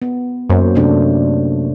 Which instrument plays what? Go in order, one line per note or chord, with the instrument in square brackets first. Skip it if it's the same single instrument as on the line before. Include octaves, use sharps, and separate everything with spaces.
[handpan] B3
[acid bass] F#2 [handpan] A#3 C5 C#5
[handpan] C3 A3 D4